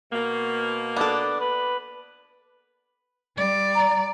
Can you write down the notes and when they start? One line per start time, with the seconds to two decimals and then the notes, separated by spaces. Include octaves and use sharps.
0.13 B2 A#3
0.96 B3 D4 A4
1.41 B4
3.37 G3 D5
3.75 A#5